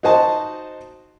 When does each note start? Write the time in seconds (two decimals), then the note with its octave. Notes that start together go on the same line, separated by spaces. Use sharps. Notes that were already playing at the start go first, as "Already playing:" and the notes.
0.03 D#4 F#4 C5 D#5 A5